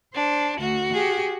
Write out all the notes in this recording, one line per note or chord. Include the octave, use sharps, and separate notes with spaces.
D4 C5
D2 F#4
G4 G#4